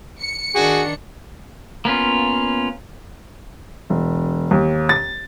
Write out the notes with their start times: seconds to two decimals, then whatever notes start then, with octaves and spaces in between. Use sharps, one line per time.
0.20 C#7
0.55 D#3 D4 F#4 G#4
1.85 A#3 B3 C#4 F4
3.90 E1
4.51 D#2
4.89 A6